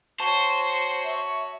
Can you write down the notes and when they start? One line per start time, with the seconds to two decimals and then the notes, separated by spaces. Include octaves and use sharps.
0.20 F#4 C5 C#5 A5
1.05 E5